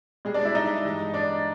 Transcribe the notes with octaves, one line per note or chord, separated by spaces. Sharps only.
B2 G3 G#3 G#4
D4 D5
E4 E5
D#4 D#5
G2 E3 G#3
D4 D5